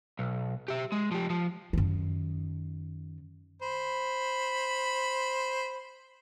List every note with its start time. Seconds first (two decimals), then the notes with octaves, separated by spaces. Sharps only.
0.19 B1
0.68 G4 E5
0.92 G#3
1.11 F3 G4
1.30 F3
1.73 F#2 D#3
3.62 C5 B5